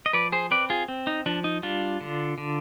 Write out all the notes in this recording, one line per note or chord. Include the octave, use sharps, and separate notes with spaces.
D#5
F3 B4 D5
G#4 C5
C4 B4 D5
F4 G#4
C4
D#4
F3 D4
D#4
G3 D4 F4
D3
D3